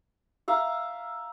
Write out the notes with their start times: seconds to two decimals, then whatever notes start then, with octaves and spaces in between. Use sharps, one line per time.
0.48 E5 F5 A#5